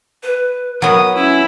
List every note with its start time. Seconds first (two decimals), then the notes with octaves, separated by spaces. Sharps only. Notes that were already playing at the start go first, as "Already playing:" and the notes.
0.23 B4
0.82 F#3 B3 A#4 D#6
1.15 C#4 E4